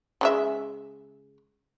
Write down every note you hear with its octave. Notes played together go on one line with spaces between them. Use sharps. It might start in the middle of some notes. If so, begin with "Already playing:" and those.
C#3 G#3 E5